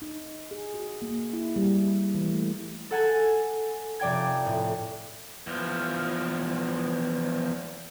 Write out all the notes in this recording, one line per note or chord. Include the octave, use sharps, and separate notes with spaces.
D#4
G#4
F#4
A#3
E4
G3
G3
E3
A3
A4 F#5 G#5 A5
F1 D5 G5 G#6
A2
E2 F3